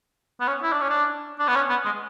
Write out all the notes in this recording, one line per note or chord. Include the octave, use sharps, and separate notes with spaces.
B3
C#4
E4
D4
C#4
D4
D4
B3
C#4
B3
G#3